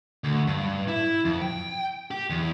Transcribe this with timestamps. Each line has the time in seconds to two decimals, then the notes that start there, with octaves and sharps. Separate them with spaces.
0.24 D2
0.47 G2
0.88 E4
1.25 F2
1.42 G5
2.11 G4
2.30 E2